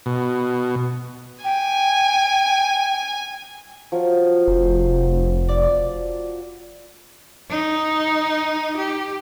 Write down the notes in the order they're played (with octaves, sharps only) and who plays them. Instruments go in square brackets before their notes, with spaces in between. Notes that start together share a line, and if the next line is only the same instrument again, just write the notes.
[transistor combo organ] B2
[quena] G5 [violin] G#5
[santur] F3 F#3 F4
[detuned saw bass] F1 [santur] C5
[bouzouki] D5
[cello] D#4
G4